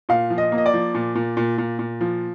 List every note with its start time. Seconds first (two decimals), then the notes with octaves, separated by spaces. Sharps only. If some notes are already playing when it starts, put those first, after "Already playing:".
0.09 A#2 F5
0.30 F3
0.38 D#5
0.52 A#3
0.58 D#5
0.66 D5
0.74 F3
0.95 A#2
1.15 A#2
1.37 A#2
1.58 A#2
1.79 A#2
2.01 F3